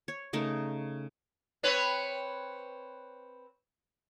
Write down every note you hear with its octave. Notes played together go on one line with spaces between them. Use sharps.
C#5
C#3 A3 D#4 A#4
C4 B4 C#5